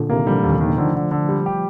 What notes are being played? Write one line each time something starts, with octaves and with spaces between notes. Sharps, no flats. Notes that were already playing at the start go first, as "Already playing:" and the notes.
Already playing: A#2 D3
C3 D#3 A#3
D3 F3 G3
D#2
D#3 A#3
D3 F3 A3
D3
D3
G3
G4